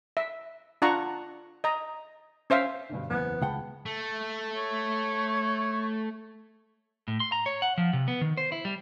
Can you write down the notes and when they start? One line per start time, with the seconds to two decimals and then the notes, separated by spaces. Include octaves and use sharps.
0.17 E5
0.82 D4 F4 F#5 A#5 C#6
1.64 D#5 A#5
2.50 C#4 C5 E5 F5
2.90 G2 B2 D3
3.11 F#1 E2 B3 G#6
3.42 C#2 F#5 G5 A5 B5
3.86 A3
4.56 C#5
7.08 A2
7.20 C6
7.32 A#5
7.46 C#5
7.62 F#5
7.78 F3
7.93 C3
8.08 B3
8.21 D#3
8.37 C5
8.52 E4
8.65 G3